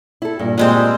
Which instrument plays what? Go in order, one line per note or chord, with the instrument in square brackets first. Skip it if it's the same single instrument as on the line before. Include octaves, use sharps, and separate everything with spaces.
[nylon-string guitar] E4 A4
G2 A#2
[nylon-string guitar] A#2 [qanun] G3 G#3 C4